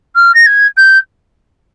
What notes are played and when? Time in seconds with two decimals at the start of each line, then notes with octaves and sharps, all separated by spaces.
0.15 F6
0.34 A#6
0.46 G#6
0.77 G6